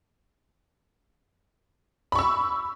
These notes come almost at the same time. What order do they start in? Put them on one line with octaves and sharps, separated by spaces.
B5 C#6 E6